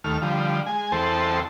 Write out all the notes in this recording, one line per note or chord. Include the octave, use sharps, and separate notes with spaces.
D#2 A3 F6
D3 F3 G3
G#3 G#5
E2 C4 A4 C5 G5 A5